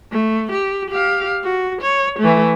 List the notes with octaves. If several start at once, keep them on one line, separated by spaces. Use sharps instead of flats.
A3
G4
G4 F5
F#4
C#5
E3 A3